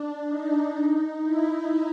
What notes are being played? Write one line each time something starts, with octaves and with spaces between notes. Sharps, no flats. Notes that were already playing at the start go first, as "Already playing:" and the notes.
Already playing: D4
D#4
E4